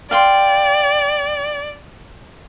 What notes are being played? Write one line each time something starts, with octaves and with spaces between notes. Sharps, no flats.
D5 F5 G5 C6